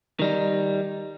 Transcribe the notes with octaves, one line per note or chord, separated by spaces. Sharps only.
D#3 G3 D#4